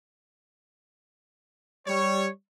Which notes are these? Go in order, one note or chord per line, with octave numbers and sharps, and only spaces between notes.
G3 C#5